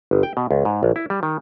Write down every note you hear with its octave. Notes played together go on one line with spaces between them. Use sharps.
G1
G5
B2
C#2
G#2
A#1
E4
G3
D#3